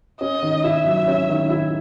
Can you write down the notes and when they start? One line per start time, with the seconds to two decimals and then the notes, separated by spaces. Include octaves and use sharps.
0.21 C#4 D#5
0.42 D#3
0.64 E4 E5
0.86 F#3
1.08 C#4
1.29 D#3
1.50 E4